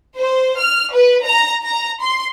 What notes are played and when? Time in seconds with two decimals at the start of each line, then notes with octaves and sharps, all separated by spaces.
0.17 C5
0.58 F6
0.92 B4
1.24 A#5
1.64 A#5
2.01 C6